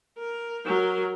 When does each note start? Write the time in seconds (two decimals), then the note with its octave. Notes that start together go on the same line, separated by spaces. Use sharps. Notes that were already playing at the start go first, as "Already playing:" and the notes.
0.18 A#4
0.65 F#3 A#4